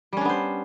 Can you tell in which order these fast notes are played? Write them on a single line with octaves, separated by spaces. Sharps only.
G3 C#4 D4 B3 C5